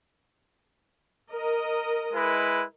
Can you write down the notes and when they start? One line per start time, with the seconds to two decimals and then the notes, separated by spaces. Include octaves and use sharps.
1.32 A#4 D#5
2.14 G#3 E4 B4